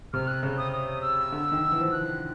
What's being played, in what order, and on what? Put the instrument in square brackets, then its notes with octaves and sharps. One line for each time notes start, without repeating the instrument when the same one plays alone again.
[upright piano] C3 [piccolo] F6
[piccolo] F#6
[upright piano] C#3
[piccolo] D#6
D#6
E6
[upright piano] D3
D#3
E3
F3
[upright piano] E3 [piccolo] F#6